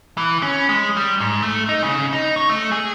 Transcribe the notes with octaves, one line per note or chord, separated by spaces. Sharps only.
E3
C#4
G#3
G3
G#2
A3
D#4
C#3
D#4
C#5
A3
G#4